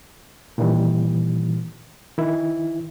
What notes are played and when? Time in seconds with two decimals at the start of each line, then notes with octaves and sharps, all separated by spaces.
0.58 A#2 D#3 E3 G3
2.18 D#3 E4